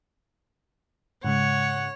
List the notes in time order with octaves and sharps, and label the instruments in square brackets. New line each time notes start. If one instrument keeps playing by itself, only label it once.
[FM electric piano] G#2 C#3 G#3 [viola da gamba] C#5 [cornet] F#5